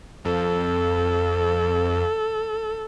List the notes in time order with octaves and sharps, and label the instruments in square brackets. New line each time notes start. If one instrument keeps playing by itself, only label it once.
[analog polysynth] F2 [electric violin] A4